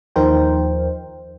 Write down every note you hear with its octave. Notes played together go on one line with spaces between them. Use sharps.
D#2 F3 D#4 A#4 C5 G5